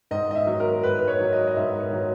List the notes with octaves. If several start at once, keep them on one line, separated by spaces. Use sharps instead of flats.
G#2 D#5
D#5
E5
F#3
A#4
G#2 B4
B4
C#5
F#3
D#5
D#5
G#2 E5
C#5
F#3